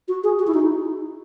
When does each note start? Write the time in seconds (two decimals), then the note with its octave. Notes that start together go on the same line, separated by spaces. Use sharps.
0.08 F#4
0.24 G#4
0.39 F#4
0.47 E4
0.54 D#4